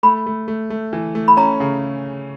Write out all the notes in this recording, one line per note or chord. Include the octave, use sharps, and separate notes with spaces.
A3 B5
A3
A3
A3
E3
A3
B5
C#4 A#5
C#3